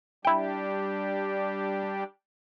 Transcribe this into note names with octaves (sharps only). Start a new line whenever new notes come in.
G3 D4 E4 G4 G5